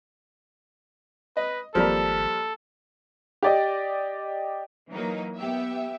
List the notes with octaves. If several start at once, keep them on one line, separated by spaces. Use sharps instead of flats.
B4 D#5
G#1 F3 G3 A#3 A4
G4 D5 D#5
E3 F#3 A#3 D#4
B3 G4 E5